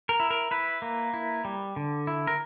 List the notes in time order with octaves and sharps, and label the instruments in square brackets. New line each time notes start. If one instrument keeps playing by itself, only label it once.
[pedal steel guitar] A#4
E4
A#4
E4 B4
A#3
E4
G3
D3
E4
A#4